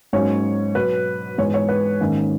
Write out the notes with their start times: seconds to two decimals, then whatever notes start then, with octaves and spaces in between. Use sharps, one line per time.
0.13 G#2 F#3 A#3 C#4 C#5
0.75 B2 F#3 B3 B4
1.38 G#2 E3 G#3 B3 C#5
1.54 C#5
1.69 B4
2.01 G#2 D#3 A#3 C#4